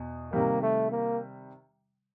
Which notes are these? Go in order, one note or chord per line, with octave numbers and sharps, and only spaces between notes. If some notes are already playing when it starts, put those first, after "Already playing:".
Already playing: E2 B2
C3 D#3 G3 A#3
A3
A#3